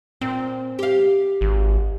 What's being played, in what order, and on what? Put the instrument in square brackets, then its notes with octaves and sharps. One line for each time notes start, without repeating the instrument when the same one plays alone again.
[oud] A#2 [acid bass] C4
[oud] G4 F5
[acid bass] G#1